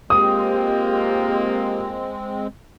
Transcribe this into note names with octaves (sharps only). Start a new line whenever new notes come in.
G#3 A#3 C4 F4 G4 D#6